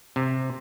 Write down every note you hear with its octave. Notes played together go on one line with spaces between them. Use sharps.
C3